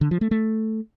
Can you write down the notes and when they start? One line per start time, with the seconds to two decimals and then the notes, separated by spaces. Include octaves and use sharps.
0.01 D3
0.11 F3
0.21 A3
0.31 A3